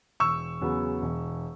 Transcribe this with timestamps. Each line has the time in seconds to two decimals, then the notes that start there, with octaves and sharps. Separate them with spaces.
0.20 E1 C#6 E6
0.61 E2 C#3 F#3 B3
1.02 E1